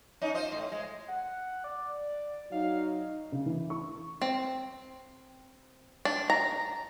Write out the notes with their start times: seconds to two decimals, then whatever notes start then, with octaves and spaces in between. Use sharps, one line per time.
0.22 C#4 D#4
0.35 F4 C5 D#5
0.52 A2
0.72 G#3
1.08 F#5
1.64 D5
2.52 F#3 D#4 F5
3.32 C#3
3.46 E3
3.70 C#6
4.22 C4
6.05 D4
6.30 A#5